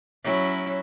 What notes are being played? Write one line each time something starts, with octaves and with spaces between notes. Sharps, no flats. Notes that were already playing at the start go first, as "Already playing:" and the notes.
F#3 C#4 E4